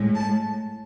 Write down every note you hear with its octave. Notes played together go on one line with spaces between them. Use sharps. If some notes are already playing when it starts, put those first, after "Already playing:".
Already playing: A2 G#3
A5